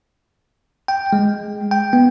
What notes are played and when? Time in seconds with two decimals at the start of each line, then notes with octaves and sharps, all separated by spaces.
0.88 G5
1.13 G#3
1.71 G5
1.93 B3